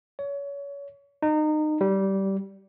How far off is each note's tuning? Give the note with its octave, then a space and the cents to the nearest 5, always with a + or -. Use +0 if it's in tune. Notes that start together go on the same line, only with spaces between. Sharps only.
C#5 +30
D#4 -25
G3 -15